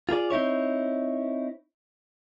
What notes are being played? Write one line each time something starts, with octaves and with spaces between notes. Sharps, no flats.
F4 G#4 A#4 D5
C4 D#4 E4 C#5